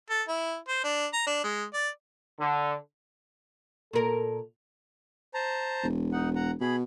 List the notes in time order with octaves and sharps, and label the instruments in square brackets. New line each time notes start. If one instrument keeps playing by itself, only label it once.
[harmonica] A4
E4
C5
D4
A#5
D4
G#3
D5
[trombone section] D3
[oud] A#2 A#4 [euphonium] A4
[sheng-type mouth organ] C5 A5 A#5
[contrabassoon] E1
[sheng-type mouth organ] D#4 F#5
F#5 A#5
[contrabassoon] B2 [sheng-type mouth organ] G#4 B5